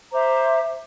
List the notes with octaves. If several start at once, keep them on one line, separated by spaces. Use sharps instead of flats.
C5 E5 A#5 D6